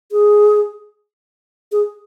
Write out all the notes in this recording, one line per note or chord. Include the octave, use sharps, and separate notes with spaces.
G#4
G#4